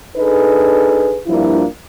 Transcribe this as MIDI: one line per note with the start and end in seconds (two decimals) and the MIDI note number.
0.16 1.18 62
0.16 1.18 63
0.16 1.18 68
0.16 1.18 69
0.16 1.18 71
1.27 1.65 43
1.27 1.65 53
1.27 1.65 58
1.27 1.65 62
1.27 1.65 64
1.27 1.65 65